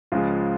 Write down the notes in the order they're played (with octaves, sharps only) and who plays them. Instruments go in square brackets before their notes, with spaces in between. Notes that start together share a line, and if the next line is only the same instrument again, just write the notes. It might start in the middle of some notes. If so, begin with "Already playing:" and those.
[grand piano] C#2 C#3 F3 G#3 F4